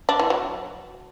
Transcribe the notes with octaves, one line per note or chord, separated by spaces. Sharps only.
D4
E3
F#3